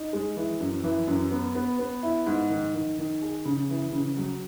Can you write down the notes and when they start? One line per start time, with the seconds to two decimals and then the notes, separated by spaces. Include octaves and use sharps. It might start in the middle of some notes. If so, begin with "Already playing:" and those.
Already playing: D#4
0.13 G#3
0.37 E3
0.60 F#2
0.84 E3
1.08 F#2
1.31 B3
1.55 B3
1.79 B3
2.03 E4
2.26 G#2
2.50 D#3
2.74 D#3
2.98 D#3
3.22 G#4
3.45 C#3
3.70 E3
3.93 C#3
4.17 F#3